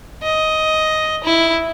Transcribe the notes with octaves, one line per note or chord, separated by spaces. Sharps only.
D#5
E4